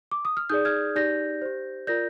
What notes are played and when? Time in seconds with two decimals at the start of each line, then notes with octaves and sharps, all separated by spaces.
0.11 D6
0.25 D#6
0.37 F6
0.50 D#4 G#4 D5 D#6 G6
0.65 F6 G#6
0.95 D#4 G4 D5 G6 A#6
1.42 G4 C5
1.87 F4 A#4 D5 G6 A#6